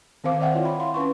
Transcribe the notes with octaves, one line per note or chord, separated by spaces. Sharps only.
D#3 C4 C5 F5 D6
D5 E5 F#5 G5
E4 F4 C#5
B5
F5 C6
C#4 B4 C6 C#6